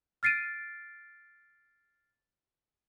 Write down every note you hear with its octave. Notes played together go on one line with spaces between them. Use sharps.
F6 A6 C7 D7 D#7